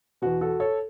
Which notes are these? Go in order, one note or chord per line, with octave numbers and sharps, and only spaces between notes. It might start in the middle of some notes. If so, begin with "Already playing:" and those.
E2 B2 F#4
F#4 A4
A4 C#5